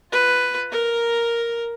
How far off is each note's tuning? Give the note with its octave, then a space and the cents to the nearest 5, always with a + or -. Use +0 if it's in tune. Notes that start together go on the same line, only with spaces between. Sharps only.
F4 +5 B4 +5
A#4 +0 A#5 +5